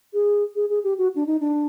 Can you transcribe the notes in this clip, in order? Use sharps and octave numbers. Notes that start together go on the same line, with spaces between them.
G#4
G#4
G#4
G4
F#4
D4
D#4
D4